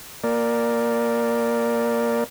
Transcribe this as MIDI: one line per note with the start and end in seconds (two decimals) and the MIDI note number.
0.24 2.24 58
0.24 2.24 70
0.24 2.24 74